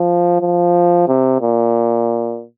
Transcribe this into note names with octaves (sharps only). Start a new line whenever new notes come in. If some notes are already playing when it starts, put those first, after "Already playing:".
Already playing: F3
F3
C3
A#2